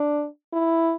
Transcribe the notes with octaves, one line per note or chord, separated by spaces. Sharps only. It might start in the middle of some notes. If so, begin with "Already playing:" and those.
Already playing: D4
E4